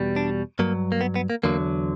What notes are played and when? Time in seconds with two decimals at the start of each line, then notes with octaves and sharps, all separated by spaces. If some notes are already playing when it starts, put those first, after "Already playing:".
Already playing: E2 B2 G3
0.16 D4
0.59 G2 F#3 A#3
0.92 A#3
1.01 B3
1.16 B3
1.30 A#3
1.43 E2 D3 F#3 A#3